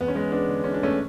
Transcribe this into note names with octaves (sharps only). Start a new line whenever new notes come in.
E2 B3
C#4
G#3 B3
B3 D4
D3
C#4
D4
A3 C#4